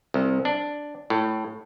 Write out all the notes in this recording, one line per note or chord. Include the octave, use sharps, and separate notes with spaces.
C2
D4
A2